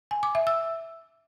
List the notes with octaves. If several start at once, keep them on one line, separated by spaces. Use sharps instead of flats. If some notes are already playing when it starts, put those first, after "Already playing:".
G#5
D6
E5
E6